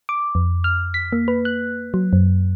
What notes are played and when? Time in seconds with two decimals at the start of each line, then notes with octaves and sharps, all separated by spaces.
0.09 D6
0.35 F2
0.64 F6
0.94 B6
1.12 A#3
1.28 B4
1.45 F#6
1.94 F#3
2.13 F#2